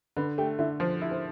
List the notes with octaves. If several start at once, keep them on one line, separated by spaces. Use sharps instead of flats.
D3 B4 B5
A3 G4 G5
D3 E4 E5
F3 C5
E4
C5